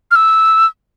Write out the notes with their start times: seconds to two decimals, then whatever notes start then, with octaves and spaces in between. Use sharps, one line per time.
0.11 F6
0.16 E6